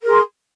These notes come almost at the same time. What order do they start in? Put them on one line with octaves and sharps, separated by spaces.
A#4 G#4 C6